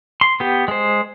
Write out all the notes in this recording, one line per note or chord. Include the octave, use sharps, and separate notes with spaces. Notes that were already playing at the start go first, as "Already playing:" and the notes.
C6
B3 G4
G#3 C5